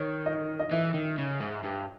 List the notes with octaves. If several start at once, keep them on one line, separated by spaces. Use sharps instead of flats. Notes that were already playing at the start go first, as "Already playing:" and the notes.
Already playing: D#3 C#5
D#5
D#5
E3 E5
D#3
C#3
G#2
G2